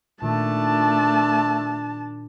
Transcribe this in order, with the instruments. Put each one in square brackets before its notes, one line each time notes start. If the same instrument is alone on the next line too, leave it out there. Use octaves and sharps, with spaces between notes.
[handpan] A#2 D#3 [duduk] A3 [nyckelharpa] D4 [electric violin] A5